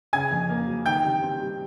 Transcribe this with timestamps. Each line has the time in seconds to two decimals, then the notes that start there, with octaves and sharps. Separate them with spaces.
0.13 C#3 G#5 G#6
0.31 F2
0.49 A#3
0.67 F#3
0.86 D#3 G5 G6
1.04 C3
1.23 C4
1.40 G3